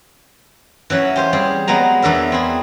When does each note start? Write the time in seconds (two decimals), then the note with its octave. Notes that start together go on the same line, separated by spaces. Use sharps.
0.90 E3 F#3 C#4
1.16 G4 C5 F5
1.33 G3 C4 G#4
1.68 F#3 G#3 B3 A#5
2.02 E2 E3 D4 A#4 E5
2.32 C4 E4 G#4